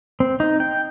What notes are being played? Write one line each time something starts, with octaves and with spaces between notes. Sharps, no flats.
C4
D#4
G5